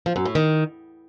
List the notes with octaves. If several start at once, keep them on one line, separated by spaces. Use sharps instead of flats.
F3
F#2
A2
D#3